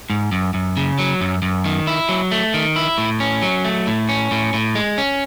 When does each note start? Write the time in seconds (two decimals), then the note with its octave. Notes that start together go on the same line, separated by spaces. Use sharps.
0.10 G#2
0.32 F#2
0.54 F#2
0.77 C#3
0.99 F#3
1.21 F#2
1.42 F#2
1.65 D#3
1.87 E4
2.09 F#3
2.31 A3
2.54 D#3
2.76 E4
2.98 A2
3.20 C#4
3.42 F#3
3.65 A3
3.87 A2
4.09 C#4
4.31 A2
4.54 A2
4.75 G#3
4.98 C#4